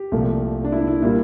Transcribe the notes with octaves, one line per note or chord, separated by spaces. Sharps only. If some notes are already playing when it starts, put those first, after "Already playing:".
Already playing: G4
C2 A#2 F3 A3
D4
E4
D4
E4
A#2 G3 A#3 E4